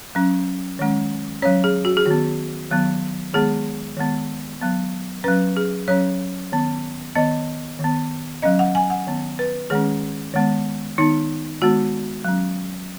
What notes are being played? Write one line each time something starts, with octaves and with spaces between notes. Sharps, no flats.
F#3 C#4
D#3 G#3 C#4
F#3 C#4 C#5
G#4
F#4
G#4
D#3 B3 F#4
D#3 F#3 B3
D#3 G#3 B3 G#4
D#3 G#3 B3
F#3 B3
F#3 C#4 B4
G#4
F#3 C#4 C#5
D#3 B3
D#3 B3 D#5
D#3
B3
F#3 C#4 D#5
F#5
G#5
F#5
D#3 B3
B4
D#3 G#3 C#4 G#4
D#3 G#3 B3
D#3 B3 D#4
D#3 G#3 B3 F#4
F#3 C#4